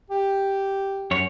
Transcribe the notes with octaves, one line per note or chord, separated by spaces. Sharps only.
G4
F#2 C#5